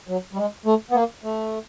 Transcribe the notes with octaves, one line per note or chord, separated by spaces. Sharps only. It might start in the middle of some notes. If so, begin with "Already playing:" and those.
F#3
G3
G#3
A3
B3
A#3
A3